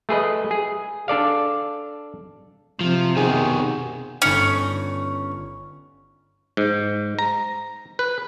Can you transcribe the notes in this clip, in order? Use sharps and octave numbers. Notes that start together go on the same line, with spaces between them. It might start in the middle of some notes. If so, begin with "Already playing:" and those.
A3 G#4 B4 D#5
G#4
D4 A4 D5 F5
C3 F3
B2 D#3 G#4
G1 C#4 D#4 C#7
G#2
A#5
B4